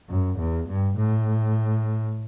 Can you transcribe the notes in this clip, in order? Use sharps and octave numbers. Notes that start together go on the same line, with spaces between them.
F#2
E2
G2
A2